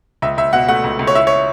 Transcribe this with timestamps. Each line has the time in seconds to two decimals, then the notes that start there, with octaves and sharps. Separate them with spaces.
0.22 C#2 E5
0.38 C#2 E5
0.53 B2 F#5
0.68 A3 F#5
0.84 C#2
0.99 C#2
1.07 C#5
1.15 E4 E5
1.27 C#5